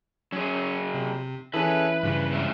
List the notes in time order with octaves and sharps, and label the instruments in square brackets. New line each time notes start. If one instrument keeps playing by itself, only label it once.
[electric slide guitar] F#3 G#4 [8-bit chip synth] C#4
[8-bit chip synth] C3
[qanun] E3 [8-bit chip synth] C#4 G#4 A4 [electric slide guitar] B4
[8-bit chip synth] G2 C#3 F3
[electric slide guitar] G#3 C4 E5